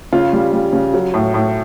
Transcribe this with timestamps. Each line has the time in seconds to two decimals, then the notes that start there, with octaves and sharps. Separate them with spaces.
0.13 C#3 F4
0.33 G3
0.53 G3
0.73 C#3
0.94 F#3
1.14 A2
1.34 A2